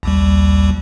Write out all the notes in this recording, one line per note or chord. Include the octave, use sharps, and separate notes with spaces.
A#1 D#2 G3